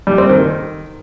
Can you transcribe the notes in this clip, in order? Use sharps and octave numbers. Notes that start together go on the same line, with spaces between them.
G3
C4
D#3